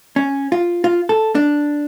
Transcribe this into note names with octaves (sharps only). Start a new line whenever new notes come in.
C#4
F4
F4
A4
D4